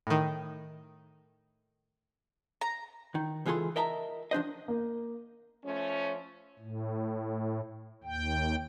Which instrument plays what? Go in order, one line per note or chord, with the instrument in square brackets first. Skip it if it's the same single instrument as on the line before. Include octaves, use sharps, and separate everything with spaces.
[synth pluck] A2 D#3
[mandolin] A#5
[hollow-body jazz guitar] D#3
C#2 E3 F4 G#4 A4 C6
A#4 D#5 E5 A5 A#5
F3 D4 C5 D#5
[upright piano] A#3
[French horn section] F3 A3 C#4
[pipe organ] A2
D#2 G5